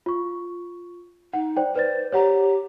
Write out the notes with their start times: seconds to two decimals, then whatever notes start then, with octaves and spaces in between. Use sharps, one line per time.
0.06 F4 C#6
1.33 D#4 F#5
1.56 C5 D5 G5
1.76 B4 C5 D5 A6
2.12 G4 C#5 F#5 A#5